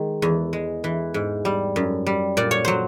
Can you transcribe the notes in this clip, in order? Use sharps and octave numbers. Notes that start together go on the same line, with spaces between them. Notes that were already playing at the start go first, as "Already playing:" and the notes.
Already playing: D#3 G#3
E2
G#3
E3
G#2
G3
F#2
G3
A#2 D5
C#5
F#3 C5